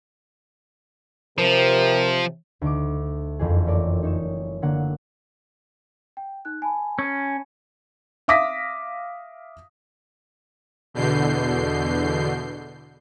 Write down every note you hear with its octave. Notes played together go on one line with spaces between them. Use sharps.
C3 F3 A#4
D2 D#4 D6
F#1 F2 E3 G#4
A3 A#4 C#5 D5
D#4 C#5 E7
D3 F#3 A#3 F#5
G5
D#4 F#6
G#5 A5 B5
C#4
E5 F5 D6 D#6 A#6 B6
E2 B2 D3 G6 C7